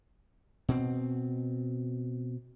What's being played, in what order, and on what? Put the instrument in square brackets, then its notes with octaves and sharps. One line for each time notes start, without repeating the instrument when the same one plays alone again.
[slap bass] B2 C4